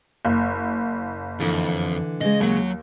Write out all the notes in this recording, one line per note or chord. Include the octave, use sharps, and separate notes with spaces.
F#1
F2 D3 E3
C#3 G#3 D#5
D#2 F#3